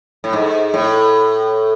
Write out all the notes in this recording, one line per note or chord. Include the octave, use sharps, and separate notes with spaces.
A2
G#2
A2